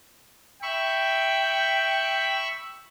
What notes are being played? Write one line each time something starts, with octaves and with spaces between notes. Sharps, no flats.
E5 G5 B5 C#6